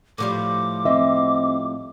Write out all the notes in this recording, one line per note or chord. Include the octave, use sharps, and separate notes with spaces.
A2 F3 G3 D6
C4 D#5 E5